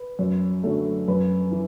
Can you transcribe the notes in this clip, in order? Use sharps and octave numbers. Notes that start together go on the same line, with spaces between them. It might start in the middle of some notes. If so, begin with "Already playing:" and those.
Already playing: B4
F#2
D3 F#3 A3
F#2 B4
E3